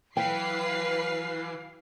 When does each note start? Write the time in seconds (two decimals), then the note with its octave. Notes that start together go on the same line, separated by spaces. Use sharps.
0.17 E3 F#3 B4 F5 G5 C7